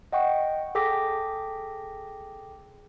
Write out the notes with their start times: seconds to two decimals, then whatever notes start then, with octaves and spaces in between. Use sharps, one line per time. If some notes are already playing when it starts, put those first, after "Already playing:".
0.12 D#5 F#5 G5 C#6
0.75 G#4 A4 G5 D6 A#6 B6